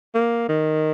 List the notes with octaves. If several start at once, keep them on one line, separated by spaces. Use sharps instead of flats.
A#3
D#3